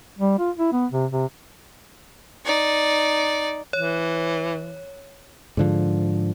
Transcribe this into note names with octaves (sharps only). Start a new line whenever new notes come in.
G3
F4
E4
B3
C3
C3
D#4 D5
E3 C#5
G#2 D3 F3